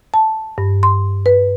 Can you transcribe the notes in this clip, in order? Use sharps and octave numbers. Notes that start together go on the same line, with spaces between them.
A5
G2
C6
B4